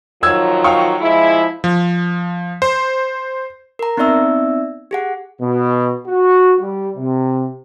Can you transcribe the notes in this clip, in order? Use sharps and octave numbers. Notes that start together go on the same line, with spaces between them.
D#3 F3 F#3 E6 G#6
F5 G5 C#6
F3 G#3 E4
F3
C5
A#4 A#5
B3 C4 D#4 D5 E5 E6
G4 G#4 F#5
B2
F#4
G3
C3